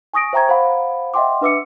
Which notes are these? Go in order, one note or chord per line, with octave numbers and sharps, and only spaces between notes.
G#5 C#6 D#6 A#6 D7
C5 E5 G5 A#5 C#6 G#6
C5 F5 F#5 B5
D#5 E5 F#5 G5 C6 D6
D4 B4 E5 D6 E6 C#7